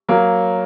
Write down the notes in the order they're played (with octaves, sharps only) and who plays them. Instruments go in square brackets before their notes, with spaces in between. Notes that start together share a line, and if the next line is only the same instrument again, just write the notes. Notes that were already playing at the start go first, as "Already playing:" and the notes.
[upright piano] F#3 A#3